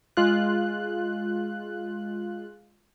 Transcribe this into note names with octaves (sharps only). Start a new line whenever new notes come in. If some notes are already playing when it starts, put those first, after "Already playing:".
G#3 F4 F#6